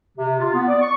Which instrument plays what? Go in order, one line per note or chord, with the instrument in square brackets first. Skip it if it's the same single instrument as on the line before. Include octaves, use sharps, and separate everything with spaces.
[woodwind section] C3
F4
B3
D5
C#6